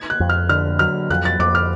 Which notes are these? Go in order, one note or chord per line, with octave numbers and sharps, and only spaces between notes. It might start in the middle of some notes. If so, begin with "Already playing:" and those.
Already playing: G#6
F#6
F2
F6
D3 F6
F#3 F6
F2 F#6
A6
F2 D6
F6